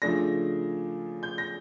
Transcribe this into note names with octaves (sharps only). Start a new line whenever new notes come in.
C#3 F3 A3 D4 A#6
G6
A#6